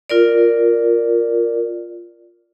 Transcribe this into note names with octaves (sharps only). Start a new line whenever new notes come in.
F4 A#4 D5